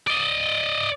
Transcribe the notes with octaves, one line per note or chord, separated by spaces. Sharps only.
D5 D#5